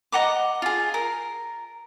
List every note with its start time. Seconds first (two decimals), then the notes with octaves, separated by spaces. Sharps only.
0.12 D#5 F#5 A#5 D6
0.62 F4 G#4
0.94 A#4